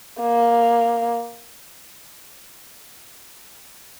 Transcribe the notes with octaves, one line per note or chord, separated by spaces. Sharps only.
A#3